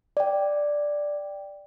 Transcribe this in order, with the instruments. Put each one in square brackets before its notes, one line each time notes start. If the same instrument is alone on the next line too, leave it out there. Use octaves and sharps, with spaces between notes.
[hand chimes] D5 G5